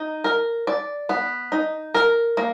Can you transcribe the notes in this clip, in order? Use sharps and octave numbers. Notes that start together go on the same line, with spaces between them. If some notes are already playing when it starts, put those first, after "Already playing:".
Already playing: D#4
A#4
D5
B3
D#4
A#4
A#3